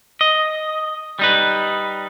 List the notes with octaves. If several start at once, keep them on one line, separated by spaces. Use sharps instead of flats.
D#5
G3 D#4 B4